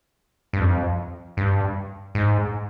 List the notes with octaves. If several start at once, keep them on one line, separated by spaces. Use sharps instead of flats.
G2
F2
G2
G#2